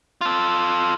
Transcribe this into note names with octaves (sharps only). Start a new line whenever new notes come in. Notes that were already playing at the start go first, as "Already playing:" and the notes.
F4 A4